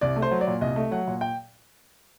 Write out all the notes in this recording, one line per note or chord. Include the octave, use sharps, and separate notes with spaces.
C2 D5
A3
C5
F#3
D5
A#2
C2 D#5
A3
F#3 F#5
A#2
G5